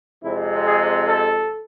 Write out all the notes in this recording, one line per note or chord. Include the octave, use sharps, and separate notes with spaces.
F2 C3 G#3 E4
G#4
A4